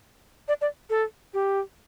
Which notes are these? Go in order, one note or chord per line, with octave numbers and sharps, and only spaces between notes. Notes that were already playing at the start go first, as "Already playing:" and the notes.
D5
D5
A4
G4